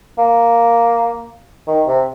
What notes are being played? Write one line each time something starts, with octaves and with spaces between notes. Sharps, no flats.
A#3
D#3
C3